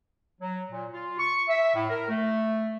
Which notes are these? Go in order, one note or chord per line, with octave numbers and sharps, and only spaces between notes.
F#3
A#2
F4
C#6
E5
A2
A#4
A3